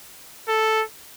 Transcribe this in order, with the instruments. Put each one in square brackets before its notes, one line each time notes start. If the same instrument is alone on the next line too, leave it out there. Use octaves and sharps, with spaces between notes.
[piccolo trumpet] A4